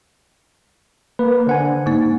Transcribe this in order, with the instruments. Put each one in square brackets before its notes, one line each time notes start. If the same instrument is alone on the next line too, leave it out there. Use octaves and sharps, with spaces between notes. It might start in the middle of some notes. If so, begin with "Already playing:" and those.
[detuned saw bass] A#3 [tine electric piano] B4
[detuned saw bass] D3 [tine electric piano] C5 F#5 G#5
[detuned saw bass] G#2 [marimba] A#3 D#4